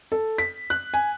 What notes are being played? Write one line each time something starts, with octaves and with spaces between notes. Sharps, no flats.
A4
B6
F#6
G#5